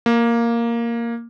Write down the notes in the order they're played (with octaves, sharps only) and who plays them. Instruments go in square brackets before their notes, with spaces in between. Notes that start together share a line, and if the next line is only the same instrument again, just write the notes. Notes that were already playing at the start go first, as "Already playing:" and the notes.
[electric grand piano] A#3